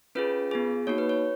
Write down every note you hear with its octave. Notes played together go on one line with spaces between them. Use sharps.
C#4 F4 G#4 B4
B3 F4 G#4
A#3 D#4 F#4 C#5
B4
C#5